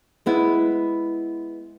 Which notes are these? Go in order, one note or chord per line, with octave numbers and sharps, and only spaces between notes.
G#3 B3 E4